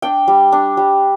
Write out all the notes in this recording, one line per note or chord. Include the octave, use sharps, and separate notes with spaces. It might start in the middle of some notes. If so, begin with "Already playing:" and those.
D4 G5
G3
D4
G3